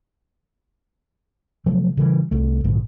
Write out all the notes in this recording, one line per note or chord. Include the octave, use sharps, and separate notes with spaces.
C3 F3 F#3 A3
C#3 E3 G3
C2 A3
A#1 G#2 D3 G#3